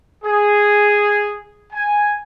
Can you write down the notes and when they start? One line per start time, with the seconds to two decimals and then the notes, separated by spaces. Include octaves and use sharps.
0.24 G#4
1.72 G#5